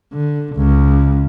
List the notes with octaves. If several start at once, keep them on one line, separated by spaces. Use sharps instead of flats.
D3
C#2